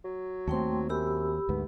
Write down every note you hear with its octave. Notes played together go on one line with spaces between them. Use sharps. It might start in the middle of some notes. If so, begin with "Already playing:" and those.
F#3
D#2 A3 C4 G5 C6
F#2 G4 B5 E6
D2 G#2 B3